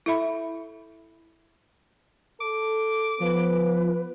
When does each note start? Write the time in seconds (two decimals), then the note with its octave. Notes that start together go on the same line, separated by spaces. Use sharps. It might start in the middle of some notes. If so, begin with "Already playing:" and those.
0.06 E4 A4 E5 B5
2.41 A4 D6
3.20 F3 B3 B4